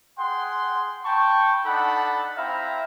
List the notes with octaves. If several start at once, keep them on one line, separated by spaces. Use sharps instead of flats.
G#4 F#5 G5 C6
G5 A5 B5 C#6
D4 D#4 A4 F#5 B5
C4 E4 E5 F5 A#5